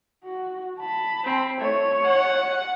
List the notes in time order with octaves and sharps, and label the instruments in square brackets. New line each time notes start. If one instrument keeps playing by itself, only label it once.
[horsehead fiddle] F#4
A5 B5
[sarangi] C4
[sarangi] A3 [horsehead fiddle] C#5
[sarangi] F#5